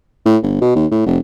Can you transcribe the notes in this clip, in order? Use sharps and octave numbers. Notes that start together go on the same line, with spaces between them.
A2
G1
B2
D#2
A2
F1